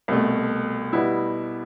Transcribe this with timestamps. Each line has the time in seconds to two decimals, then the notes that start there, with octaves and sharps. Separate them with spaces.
0.08 C2 B2 A3
0.93 B2 G3 B3 E4